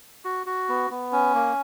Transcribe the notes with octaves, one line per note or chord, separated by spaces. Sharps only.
F#4
F#4
B3
B3
C#4
A#3